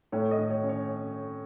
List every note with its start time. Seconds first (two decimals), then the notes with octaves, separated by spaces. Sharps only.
0.12 A2 C#5
0.31 D#5
0.38 A2
0.50 C#5
0.63 C#4
0.69 C#5